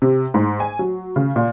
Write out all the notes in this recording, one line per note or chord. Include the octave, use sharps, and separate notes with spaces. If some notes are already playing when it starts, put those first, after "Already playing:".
C3
G#2
G#5
F#3
C#3
A#2